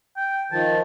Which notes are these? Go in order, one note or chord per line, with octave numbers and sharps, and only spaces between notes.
G5
D#3 F3 A5